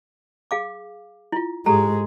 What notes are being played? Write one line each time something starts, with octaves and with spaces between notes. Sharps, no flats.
G#4 F5 D6
E4 F4
G#2 G#3 G4 A4 A#5